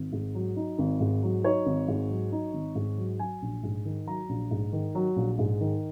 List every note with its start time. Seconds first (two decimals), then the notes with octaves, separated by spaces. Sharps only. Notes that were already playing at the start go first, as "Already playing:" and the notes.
Already playing: G#1
0.12 G#2
0.35 F#3
0.56 D#4
0.79 G#1
1.00 G#2
1.23 F#3
1.44 D#4 C#5
1.66 G#1
1.88 G#2
2.10 F#3
2.32 D#4
2.54 G#1
2.75 G#2
2.98 F#3
3.19 F#3 G#5
3.42 A#1
3.63 G#2
3.85 D#3
4.07 F#3 A#5
4.29 A#1
4.51 G#2
4.73 D#3
4.95 F#3
5.16 A#1
5.39 G#2
5.61 D#3